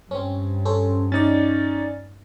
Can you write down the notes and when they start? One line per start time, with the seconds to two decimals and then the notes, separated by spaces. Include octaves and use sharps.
0.11 G2 C4 C#4
0.65 C#4 A4 C5
1.12 C#4 D#4 D5 A6